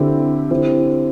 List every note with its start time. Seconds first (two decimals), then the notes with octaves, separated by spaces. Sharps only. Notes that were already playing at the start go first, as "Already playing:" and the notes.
Already playing: D3 C4 E4 G4
0.51 D3 C4 E4 G4